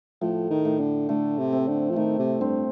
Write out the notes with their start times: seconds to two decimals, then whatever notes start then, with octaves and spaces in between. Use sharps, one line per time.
0.21 A2 F3
0.50 D#3
0.65 A2
0.80 D3
1.09 D3 A3
1.38 C3
1.52 C4
1.68 D3
1.90 F3
1.96 D#3 A3
2.19 C3
2.40 G2 C4